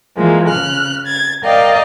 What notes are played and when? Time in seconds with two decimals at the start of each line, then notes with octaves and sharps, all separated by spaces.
0.16 E3 F3 G#3 A#3
0.47 C#3 F6 F#6
1.06 G#6 A6
1.43 A#4 D5 D#5 F5 G5